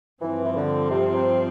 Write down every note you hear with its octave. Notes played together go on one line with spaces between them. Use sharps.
G2 E3 F3 C4
E3
D3
C3
C3